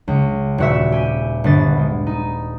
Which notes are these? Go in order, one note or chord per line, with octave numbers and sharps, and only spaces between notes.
C#2
D#1 F#4 E5
G4 G#5
G1 B3 A6
G#3
D#4